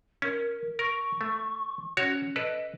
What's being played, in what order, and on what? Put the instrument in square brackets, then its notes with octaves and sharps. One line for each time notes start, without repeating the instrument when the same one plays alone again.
[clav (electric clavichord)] C#4 [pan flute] A#4
[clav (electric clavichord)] A#4 [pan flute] C#6
[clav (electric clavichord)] A3
[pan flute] C#4 [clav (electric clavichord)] F#4 C#5
[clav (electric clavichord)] A4 B4 D5 [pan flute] D#5